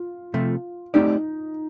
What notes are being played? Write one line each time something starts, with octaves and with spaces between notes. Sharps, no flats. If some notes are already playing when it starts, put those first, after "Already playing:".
Already playing: F4
C3 F3 A3
A3 C4 D#4 G4 D5